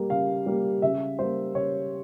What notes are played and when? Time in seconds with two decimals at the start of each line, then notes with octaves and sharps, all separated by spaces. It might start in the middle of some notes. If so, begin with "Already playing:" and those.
Already playing: G3 A#3
0.10 C#3 F5
0.46 G3 A#3
0.82 C#3 E5
1.19 G3 A#3 C5
1.55 C#3 C#5